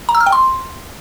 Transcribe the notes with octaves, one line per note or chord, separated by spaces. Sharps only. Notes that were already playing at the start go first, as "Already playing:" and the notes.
A#5
E6
F6
G5
C6